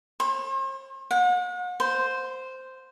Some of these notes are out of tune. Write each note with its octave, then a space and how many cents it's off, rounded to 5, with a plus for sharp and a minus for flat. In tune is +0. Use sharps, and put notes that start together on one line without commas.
C5 +45
F#5 -40
C5 -5